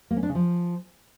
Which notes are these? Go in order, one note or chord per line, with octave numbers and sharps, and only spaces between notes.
A#3
C#4
D4
C#3
F3